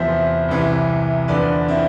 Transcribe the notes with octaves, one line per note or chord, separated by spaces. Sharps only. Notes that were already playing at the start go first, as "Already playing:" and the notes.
Already playing: E2 C3 F3 C5 E5
C2 C3 E3
E2 D3 F3 B4 D5
C4 E4